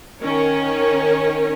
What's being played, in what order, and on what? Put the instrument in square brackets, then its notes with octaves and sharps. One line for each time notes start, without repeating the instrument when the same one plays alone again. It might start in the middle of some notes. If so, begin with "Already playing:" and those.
[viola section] D#3 C#4 A#4 C#5